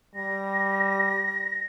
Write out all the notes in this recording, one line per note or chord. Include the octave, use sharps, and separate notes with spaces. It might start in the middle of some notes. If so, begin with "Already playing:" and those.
G3 A#6